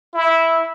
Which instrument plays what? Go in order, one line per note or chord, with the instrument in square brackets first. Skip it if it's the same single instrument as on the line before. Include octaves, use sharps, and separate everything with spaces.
[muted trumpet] E4